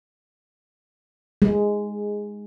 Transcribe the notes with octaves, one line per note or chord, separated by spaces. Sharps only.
G#3